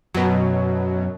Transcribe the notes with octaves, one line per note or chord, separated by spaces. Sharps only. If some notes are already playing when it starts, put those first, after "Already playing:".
F#2 B2 F#3